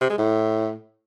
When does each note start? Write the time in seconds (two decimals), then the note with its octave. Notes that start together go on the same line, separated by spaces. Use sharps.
0.01 C3
0.10 G#3
0.18 A2